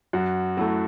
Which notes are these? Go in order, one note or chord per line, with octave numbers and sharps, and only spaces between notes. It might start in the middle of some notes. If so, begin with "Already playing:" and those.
F#2 F#4
F#3 A3 E4